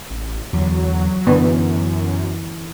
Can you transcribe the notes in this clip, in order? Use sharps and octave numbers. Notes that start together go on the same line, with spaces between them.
A1
E2 D3 F#3
F#2 D3 E3 B3